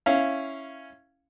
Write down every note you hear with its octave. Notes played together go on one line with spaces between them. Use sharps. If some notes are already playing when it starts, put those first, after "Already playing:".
C#4 E4 F5